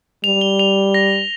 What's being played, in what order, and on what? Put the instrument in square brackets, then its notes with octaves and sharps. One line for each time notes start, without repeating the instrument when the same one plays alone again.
[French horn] G3 [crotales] F7
[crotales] G7
F7
A#6